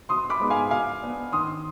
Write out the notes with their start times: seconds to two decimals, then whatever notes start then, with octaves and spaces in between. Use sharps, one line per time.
0.09 B2 C6 D#6
0.30 B5 D6
0.40 G#3 B3 D#4
0.50 F5 G#5
0.70 B2 F5 G#5
1.02 B3 D4
1.32 D#3 C6 D#6